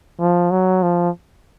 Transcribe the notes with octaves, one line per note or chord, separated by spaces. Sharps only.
F3
F#3
F3